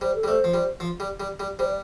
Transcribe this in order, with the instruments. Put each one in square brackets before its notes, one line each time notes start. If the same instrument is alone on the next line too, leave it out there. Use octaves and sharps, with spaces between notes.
[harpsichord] G3 [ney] C5
[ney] A4
[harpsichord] G3
[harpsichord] A3 [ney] C5
[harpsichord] F3
G3
F3
G3
G3
G3
[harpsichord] G3 [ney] C5
[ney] D5